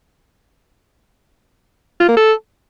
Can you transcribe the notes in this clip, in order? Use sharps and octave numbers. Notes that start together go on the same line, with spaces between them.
F4
A#3
A4